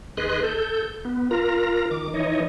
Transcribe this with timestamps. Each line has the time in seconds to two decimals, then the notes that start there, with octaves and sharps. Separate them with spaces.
0.17 D#2 G#4 B4 D#5 C6 F#6
0.43 A4 G6
1.05 B3
1.31 F4 A#4 A#5
1.91 D#3 D6
2.14 E3 D#4 C#5 D#5